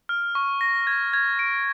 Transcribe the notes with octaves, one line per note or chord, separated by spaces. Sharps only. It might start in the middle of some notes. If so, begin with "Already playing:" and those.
F6
C#6
A#6
G#6
G#6
D7